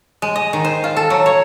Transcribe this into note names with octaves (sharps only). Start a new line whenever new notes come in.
G#3
D#5
D#3
C5
F4
A4
F#3
C#5